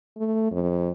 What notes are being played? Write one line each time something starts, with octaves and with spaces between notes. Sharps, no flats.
A3
F2